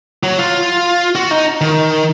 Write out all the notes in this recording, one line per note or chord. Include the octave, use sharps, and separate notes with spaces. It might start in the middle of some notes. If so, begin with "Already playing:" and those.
F#3
F4
F#4
D#4
D#3